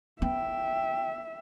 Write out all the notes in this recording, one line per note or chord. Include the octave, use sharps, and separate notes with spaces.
B3 E5 G5